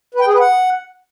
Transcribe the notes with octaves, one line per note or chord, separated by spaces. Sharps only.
B4
G5
G#4
B4
F#5